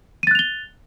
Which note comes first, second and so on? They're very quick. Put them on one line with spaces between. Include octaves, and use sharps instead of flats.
D#7 A6 F#6 F7 G7